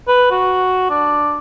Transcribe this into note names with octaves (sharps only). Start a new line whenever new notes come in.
B4
F#4
D4